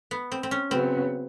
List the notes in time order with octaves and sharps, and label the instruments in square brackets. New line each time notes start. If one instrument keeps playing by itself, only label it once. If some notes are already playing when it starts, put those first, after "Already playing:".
[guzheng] B3
C4
C4
C#4
[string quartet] C#3 F#3 B3 [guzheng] C4